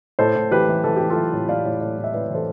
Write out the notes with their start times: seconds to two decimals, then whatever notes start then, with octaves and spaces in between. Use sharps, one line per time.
0.19 A2 A4 C5
0.35 A2
0.51 E3 G4 B4
0.68 E3
0.84 E3 A4
0.96 E3 G4
1.10 F4 A4
1.16 E3
1.33 A2
1.49 A2 D5 F5
1.65 A2
1.80 A2
1.98 A2
2.04 E5
2.13 A2 B4 D5
2.30 E3 A4 C5